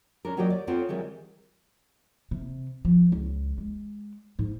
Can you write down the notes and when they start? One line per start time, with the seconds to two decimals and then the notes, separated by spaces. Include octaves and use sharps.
0.25 C#4 D4 A#4
0.37 D#3 F#3 A#3 G4 D5 D#5
0.50 D5
0.67 B3 C4 F4 A4 C5 C#5
0.89 D#3 E3 G3 G#3
2.31 C3
2.85 F3
3.12 C#2
3.58 G#3
4.39 G#2